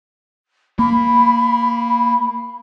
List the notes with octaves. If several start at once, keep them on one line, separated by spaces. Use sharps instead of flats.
A#3 B5